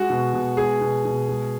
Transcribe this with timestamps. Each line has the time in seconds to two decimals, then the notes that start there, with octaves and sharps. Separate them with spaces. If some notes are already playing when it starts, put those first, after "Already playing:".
Already playing: G#3 F#4
0.10 B2
0.34 B2
0.57 G#3 G#4
0.81 B2
1.05 B2
1.29 G#3